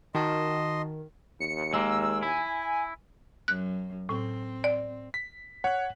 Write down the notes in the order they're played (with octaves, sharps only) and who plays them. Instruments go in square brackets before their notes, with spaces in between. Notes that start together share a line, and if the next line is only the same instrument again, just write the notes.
[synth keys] D#3 [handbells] D#4 F#4 A5 [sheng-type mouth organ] D#5 C6
[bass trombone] D#2 [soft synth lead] C#7
[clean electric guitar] G#3 A#3 [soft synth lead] E6
[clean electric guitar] E4 [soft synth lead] G#5
[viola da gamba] F#2 [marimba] F#6
[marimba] A2 [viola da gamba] C4
[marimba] D5
[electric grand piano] B6
[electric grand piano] C#5 F#6 [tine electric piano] F#5